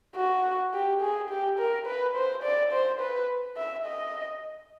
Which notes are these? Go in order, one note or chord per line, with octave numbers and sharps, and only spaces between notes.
F#4
G4
G#4
G4
A#4
B4
C5
D5
C5
B4
E5
D#5